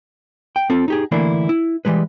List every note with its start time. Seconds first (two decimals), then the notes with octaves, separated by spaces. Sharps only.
0.56 G5
0.70 C4 F4 A4
0.88 D#4 G4 G#4
1.12 D3 E3 A3 A#3 D4 E4
1.49 E4
1.85 E3 G3 G#3 B4